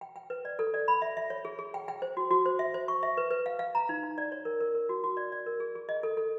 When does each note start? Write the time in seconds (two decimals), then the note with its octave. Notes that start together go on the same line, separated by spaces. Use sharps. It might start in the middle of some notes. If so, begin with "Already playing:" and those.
0.01 G5
0.16 G5
0.30 B4
0.45 D5
0.59 A4
0.74 D5
0.88 B5
1.02 E5
1.17 E5
1.30 C#5
1.45 G#4
1.59 G#4
1.74 G5
1.88 G5
2.02 C5
2.17 F#4
2.31 F#4
2.46 C5
2.59 E5
2.74 C5
2.88 C#6
3.03 E5
3.17 B4
3.31 B4
3.46 F5
3.59 F5
3.75 A#5
3.89 D#4
4.03 D#4
4.18 D5
4.32 C#5
4.45 A#4
4.61 A#4
4.75 A#4
4.89 F#4
5.04 F#4
5.17 D5
5.32 D5
5.47 A#4
5.60 G#4
5.75 G#4
5.89 D#5
6.03 A4
6.17 A4